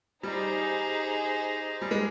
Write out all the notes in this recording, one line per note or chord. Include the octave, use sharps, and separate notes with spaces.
G3 D#4 G#4 C5
G3
G#3